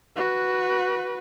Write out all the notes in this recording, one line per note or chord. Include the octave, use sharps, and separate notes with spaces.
F#4 B4